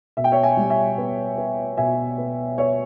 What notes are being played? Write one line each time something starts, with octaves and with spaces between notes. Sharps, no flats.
B2 E5
G5
C#5 E5
E5 G#5
G3
E5 G#5
B3
B3
B2 E5 G#5
B3
B3 C#5 E5